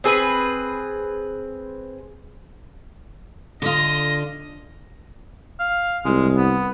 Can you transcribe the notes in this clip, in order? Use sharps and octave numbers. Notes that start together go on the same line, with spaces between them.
C4 G#4 B4
D3 F4 D#5
F5
C2 G#3
B3